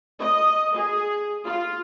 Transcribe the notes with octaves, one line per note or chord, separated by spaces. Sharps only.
D#5
G#4
F4